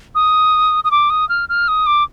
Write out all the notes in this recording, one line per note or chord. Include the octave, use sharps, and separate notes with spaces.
D#6
D#6
D6
D#6
F6
F6
D#6
D6